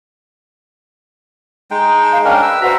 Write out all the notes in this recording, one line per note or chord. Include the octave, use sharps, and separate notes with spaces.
G#3 D#4 G5
A5
F5
C#4 D4 A#4 G5
B4 E6
F#4 B4 C5 E5 A#5